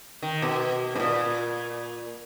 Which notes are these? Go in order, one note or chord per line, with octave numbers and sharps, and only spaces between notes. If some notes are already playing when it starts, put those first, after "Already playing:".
D#3
B2
G#2
A#2